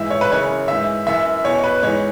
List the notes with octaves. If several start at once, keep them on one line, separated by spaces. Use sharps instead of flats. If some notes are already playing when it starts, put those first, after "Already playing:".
Already playing: G#2 E3 E5
C#5
B4
F#2 C#3 E3 C#5
G#2 E3 E5
F#2 E3 E5
E2 B2 C#5
B4
G#2 E3 C#5